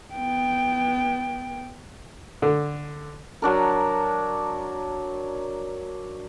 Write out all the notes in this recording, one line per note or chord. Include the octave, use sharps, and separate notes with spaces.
B3 G5
D3
F#3 D4 A#4